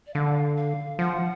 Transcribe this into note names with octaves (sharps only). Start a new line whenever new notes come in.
D5
D3 F5
F5
F3 F#5